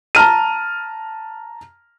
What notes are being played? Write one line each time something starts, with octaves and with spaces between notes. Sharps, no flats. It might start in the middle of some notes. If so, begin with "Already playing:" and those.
A5 A#5 F6 D#7